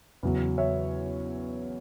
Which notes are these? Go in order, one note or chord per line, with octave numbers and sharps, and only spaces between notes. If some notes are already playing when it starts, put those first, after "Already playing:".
E2 C#3 F#3
C#5 E5